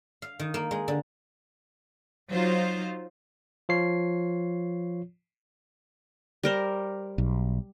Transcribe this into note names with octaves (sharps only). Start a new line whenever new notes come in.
F5
D#3
A#3
G#3
D3
F#3 D#4 F4 C5
F3 F4 C#5 C7
G3 A#4 C5
B1